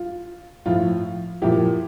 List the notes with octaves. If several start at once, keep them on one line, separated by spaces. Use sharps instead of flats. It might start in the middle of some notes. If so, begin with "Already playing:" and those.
Already playing: F4
A2 F3 F4
A#2 F3 E4 G4